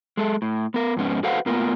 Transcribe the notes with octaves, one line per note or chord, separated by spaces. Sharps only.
G#3 A4
A2
B3 A#4
F2 G#2 B3 C#4
F#4 A4 B4 C5 F5 F#5
A2 A#3 B3 F4 A#4